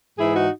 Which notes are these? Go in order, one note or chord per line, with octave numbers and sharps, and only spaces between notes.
G#2 E3 E4 G#4
D#4 F#4